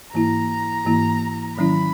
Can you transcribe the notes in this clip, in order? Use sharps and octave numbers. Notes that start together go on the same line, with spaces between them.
G#2 E3 A#3 E4 A#5
G#2 E3 A#3 E4
G#2 D#3 F#3 C#4 E4 B5